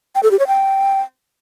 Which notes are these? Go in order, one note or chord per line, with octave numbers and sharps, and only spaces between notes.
G5
A4
G4
C#5
G5